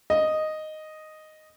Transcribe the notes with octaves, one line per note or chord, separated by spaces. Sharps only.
D#5